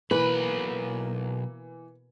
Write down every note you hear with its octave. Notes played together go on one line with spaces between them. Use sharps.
B1 B2 E3 A#3 B4 B5